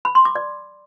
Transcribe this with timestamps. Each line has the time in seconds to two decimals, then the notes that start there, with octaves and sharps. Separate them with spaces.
0.05 B5
0.15 C6
0.25 D6
0.35 D5